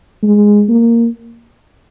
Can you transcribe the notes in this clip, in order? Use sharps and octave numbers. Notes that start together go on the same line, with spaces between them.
G#3
A#3